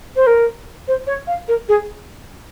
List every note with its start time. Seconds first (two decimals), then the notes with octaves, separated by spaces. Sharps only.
0.16 C5
0.26 A#4
0.87 C5
1.06 C#5
1.27 F5
1.48 A#4
1.68 G#4